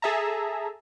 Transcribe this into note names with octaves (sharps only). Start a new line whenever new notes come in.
G#4 A4 E5 A5 A#5